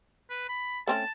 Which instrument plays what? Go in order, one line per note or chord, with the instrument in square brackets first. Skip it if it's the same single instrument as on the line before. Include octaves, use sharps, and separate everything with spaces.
[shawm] B4
B5
[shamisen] A3 C4 C#4 [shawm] A5